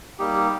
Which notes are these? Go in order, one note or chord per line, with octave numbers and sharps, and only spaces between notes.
G3 A#3 D#4 G4